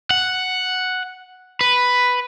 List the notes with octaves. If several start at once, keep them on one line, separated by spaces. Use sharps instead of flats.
F#5
B4